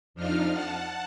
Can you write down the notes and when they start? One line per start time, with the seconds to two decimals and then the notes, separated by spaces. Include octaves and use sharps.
0.14 F2 F3 D4 D#4 F4 F6
0.52 F#5 A5